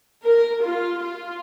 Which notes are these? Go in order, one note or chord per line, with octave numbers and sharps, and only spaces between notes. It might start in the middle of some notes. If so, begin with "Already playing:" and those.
A#4
F4
F4